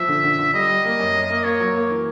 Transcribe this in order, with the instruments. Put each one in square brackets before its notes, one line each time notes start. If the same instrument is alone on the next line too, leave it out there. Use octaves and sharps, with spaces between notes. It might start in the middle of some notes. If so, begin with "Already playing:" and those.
Already playing: [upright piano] F3 [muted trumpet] E5
[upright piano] D3
D3
D3
[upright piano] G3 [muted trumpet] D#5
[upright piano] G3
A#3
F#2
F#2
A#3
[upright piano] A#3 [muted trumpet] C#5
[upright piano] F#3
A#3
E3